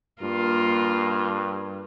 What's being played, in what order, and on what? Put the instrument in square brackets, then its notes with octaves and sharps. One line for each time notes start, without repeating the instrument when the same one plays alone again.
[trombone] G2 [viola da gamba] A#3 F4